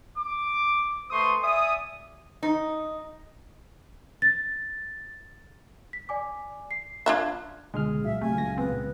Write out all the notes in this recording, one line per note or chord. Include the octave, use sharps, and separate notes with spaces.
D6
A3 B4 C5 C6 C#6 D#6
D5 E5 G#5 D#6
D#4
A6
B6
D5 G#5 D6
C7
D4 F4 E5 F#6 G#6
C#2 B2 D3 G#3 G#4 F6
A#2 F#3 E5 F5
C3 A3 G#5
C#2 C#3 A#6
B3 C4